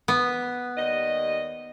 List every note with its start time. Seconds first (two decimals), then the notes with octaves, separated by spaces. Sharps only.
0.08 B3
0.77 D#2 G3 D#5